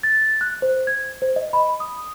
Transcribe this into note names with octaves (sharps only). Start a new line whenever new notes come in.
A6
F#6
C5
G#6
C5
D#5
B5
D#6